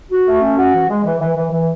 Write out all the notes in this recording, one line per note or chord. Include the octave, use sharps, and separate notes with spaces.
F#4
A3
C#4
F#4
E3
G#3
E3
E3
E3
E3